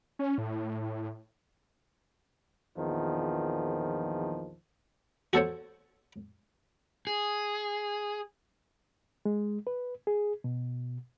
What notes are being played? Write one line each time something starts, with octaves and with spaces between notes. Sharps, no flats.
C#4
A2
A#1 E2 D#3 F3
F#4 A4 C5 C#5
G#4
G#3
B4
G#4
B2